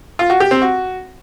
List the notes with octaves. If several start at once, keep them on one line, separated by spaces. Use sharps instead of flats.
F4
F#4
G4
C4
F#4